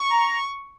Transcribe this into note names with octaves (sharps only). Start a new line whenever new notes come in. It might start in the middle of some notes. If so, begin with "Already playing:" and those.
Already playing: C#6
A#5